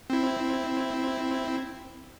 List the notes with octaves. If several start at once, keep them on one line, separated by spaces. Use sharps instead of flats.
C4 E4